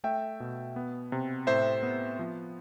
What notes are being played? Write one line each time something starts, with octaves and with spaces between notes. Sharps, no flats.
A3 E5 G5
B2
B3
C3
A2 C5 E5
B3
F3